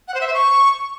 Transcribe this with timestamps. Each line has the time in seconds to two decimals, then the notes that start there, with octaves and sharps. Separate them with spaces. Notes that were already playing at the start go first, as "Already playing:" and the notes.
0.08 F#5
0.14 C5
0.21 E5
0.27 C5
0.34 C#6